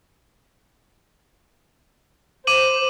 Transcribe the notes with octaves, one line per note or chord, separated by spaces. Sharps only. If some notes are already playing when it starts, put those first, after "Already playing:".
C5 D6 D#7 F#7